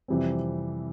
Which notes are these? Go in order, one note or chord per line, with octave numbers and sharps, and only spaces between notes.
F2 C3 E3 G3 C4